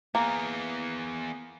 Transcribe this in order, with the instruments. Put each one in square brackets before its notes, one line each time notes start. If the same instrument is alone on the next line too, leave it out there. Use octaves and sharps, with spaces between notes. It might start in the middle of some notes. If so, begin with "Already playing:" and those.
[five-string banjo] A#3 [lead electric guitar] B3 G#4